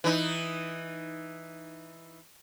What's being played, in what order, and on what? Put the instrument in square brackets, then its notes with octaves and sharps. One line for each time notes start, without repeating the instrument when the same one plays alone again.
[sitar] E3 D#4